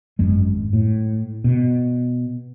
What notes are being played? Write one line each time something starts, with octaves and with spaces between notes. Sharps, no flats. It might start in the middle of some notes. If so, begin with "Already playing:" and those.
G#1 F#2 G#3
A2
B2